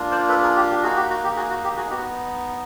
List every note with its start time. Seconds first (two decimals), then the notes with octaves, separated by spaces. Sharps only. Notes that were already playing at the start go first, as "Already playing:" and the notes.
Already playing: A#3 D4 F4
0.11 C5 D5
0.29 A4 B4
0.42 G#4 A#4
0.56 G4
0.70 G4
0.83 A#3 D#4 F#4 G#4
0.96 G4
1.10 F#4
1.24 G4
1.36 F#4 G#4
1.50 F#4
1.64 G4
1.77 F#4 G#4
1.90 B3 D#4 F#4 G4